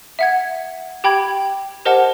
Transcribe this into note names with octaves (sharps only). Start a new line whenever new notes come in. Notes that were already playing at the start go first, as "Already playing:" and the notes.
E5 F#5 G#6
G4 G5 B5 G#6
G4 A#4 C5 D#5 F#5 A5